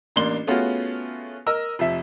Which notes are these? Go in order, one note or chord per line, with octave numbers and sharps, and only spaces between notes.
A1 A#3 D4 C6 G7
A3 B3 C#4 F4 F#4 G#4
A#4 D#5 E6
F1 F3 E5